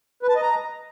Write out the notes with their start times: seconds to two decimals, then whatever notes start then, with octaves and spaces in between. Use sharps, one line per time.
0.23 B4
0.29 A5
0.35 D#5
0.42 A#5